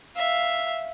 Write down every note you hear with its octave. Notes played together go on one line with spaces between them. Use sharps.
E5 F5